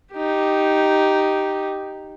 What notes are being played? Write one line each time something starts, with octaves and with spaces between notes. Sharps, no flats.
D#4 G4